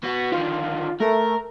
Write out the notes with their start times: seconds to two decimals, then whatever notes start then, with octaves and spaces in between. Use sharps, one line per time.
0.03 B3 F#4
0.32 D3 D#3 F4
1.00 A3 A#4